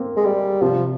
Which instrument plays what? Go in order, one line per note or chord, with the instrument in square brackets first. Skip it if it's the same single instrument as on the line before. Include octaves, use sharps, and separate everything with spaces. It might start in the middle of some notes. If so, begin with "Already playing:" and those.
Already playing: [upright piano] A#3 C4
[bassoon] G#3
G3
[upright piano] C3 [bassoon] F3